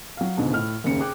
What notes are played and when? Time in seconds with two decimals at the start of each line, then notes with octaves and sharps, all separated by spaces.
0.17 F#3 F5
0.37 C#2 G#2 B2 D3
0.53 A2 F6
0.84 F#1 D#2 C#3 C#7
1.00 G#4 G5 D6 F#6